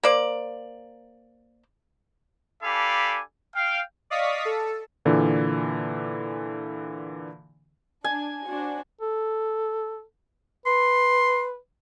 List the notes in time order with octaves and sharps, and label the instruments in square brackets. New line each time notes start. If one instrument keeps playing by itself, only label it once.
[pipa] A#3 C5 D5
[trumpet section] D4 G4 A4 F5 G#5 B5
F5 G5
[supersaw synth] D5 D#5 F5 C#6 D#6 B6
A4
[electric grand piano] A#2 D3 E3
[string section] D4 [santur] G#5
[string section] D4 F#4 C5
[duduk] A4
[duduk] B4 [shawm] C6